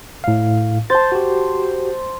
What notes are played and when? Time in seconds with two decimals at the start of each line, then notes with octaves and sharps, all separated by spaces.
0.24 A2 F5
0.90 C5 A5 G6 A6
1.12 F#4 G4